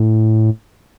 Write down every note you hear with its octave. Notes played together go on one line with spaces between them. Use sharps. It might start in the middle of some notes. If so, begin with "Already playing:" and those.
Already playing: A2